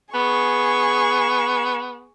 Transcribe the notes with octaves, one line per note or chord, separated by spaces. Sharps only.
B3 G#4 C#6